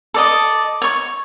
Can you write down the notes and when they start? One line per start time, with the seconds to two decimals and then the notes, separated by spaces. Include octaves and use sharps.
0.14 A4 D5 D#5
0.82 C#5 C#6